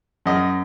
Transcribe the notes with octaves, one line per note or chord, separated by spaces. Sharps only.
F#2 D#5